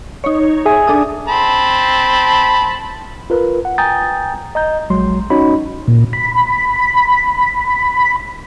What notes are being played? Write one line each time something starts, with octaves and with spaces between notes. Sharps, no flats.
D#4 C#5
G#4 E5 G#5
D4 A4 D#6
C4 A5 B5
F4 A#4 B4
F#5
G5 G#5 A#5 D#6 G6 A6
D#5 A#5 G6
A#1 F#3 G#3 C6
C#4 D#4 F#4 C#5 D#5 B5
A#2
B5